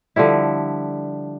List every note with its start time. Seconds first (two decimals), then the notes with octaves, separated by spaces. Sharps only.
0.16 D3 F3 G3 E4